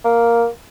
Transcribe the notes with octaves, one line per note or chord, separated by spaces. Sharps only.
A#3